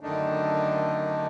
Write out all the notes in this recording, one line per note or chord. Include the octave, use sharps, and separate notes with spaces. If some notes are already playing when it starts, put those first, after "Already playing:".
F#2 D3 D#3 A3 D4 D#4